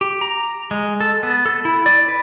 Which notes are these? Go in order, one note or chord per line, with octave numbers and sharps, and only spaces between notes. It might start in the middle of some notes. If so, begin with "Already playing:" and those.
G4
A#5
G#3
A4
B3
A4
E4
D5
B4